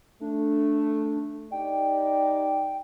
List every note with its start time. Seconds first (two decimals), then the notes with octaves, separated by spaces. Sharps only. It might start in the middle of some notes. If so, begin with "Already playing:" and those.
0.21 A3 D4
1.52 D#4 G4 D5 G5